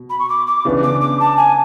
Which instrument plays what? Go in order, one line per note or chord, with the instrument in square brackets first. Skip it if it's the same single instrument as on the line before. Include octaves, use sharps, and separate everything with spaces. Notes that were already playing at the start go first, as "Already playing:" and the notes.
Already playing: [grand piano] B2
[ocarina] B5
C#6
D6
D6
[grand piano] C#3 E3 B3 D4
[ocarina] D6
D6
A5
G#5